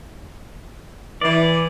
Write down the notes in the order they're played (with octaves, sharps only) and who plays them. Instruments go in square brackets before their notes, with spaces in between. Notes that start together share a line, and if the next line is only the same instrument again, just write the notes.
[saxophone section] E3 [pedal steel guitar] D5